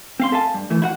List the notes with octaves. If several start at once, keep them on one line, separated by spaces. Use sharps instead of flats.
C4 F5 C6
A4 E5 F5 G#5 A5
G2
E3 A3
E4 F#4 F#5